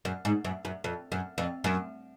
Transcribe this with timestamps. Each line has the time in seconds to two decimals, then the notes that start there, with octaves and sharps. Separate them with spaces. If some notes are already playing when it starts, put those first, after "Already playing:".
0.05 F#2
0.25 G#2
0.45 F#2
0.65 F#2
0.84 F2
1.12 F#2
1.38 F2
1.64 F#2